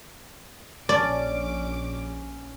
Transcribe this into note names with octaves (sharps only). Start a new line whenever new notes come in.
A#1 C#4 D5 D6